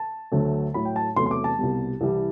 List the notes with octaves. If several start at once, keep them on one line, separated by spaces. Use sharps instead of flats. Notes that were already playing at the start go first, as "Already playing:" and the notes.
Already playing: A5
D2 D3 F#3 A3
A2 F#3 A3 B5
G5
A5
E2 C3 F#3 A3 C6
C6
D6
A5
C2 B2 G3
C2 C3 E3 G3